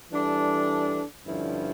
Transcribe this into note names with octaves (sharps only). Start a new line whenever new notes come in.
E3 G3 D4 A4
G2 D3 F3 C#4 E4